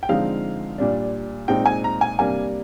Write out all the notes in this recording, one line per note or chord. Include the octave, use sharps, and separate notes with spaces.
G5
D3 F3 G#3 C4 D#4 F5
A#2 G3 D4
A#2 G#3 C4 D#4 G5
G#5
A#5
G#5
C3 G3 A#3 D4 G#5